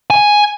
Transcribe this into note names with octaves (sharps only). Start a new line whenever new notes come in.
G#5